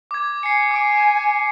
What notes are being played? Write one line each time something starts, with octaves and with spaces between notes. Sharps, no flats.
D6 G#6
G#5 C7 C#7
D6 D7